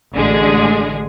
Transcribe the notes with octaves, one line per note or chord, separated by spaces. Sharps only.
A1 D3 G#3 G#4